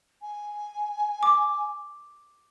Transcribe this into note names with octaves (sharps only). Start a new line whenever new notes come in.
G#5
D6